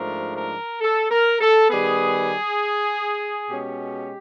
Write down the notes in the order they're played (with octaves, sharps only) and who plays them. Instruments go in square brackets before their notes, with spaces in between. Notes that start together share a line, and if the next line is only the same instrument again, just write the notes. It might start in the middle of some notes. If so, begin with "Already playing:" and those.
Already playing: [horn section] G#2 F3 A3 D4 A#4
A#4
A4
A#4
A4
D#3 G3 B3 G#4
B2 G#3 C#4 G4